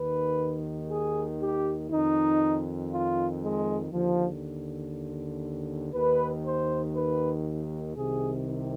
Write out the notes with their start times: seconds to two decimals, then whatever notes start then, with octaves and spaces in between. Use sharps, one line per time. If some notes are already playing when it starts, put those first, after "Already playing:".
Already playing: D#2 D#3 B4
0.89 G#4
1.39 G4
1.90 F2 D#3 D#4
2.91 F4
3.42 G#3
3.92 D#2 D3 F3
5.94 D#2 D#3 B4
6.44 C5
6.95 B4
7.96 C2 C3 D#3 G#4